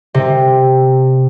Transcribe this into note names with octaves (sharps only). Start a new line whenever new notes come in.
C3